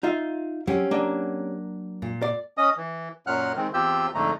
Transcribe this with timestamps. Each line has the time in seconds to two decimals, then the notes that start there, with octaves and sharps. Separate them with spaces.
0.03 D#4 F4 E5
0.67 F#3 C4 C#4 G4
0.91 F#3 A#3 D4
2.02 A#2
2.22 D5
2.58 C#4 D#5 D#6
2.77 E3
3.27 F#2 A#2 F#3 F#5 F6 F#6
3.57 D#3 G#3 C4
3.74 E2 C4 F4 G4 E6 G6
4.14 F2 G#2 D3 A3 A#5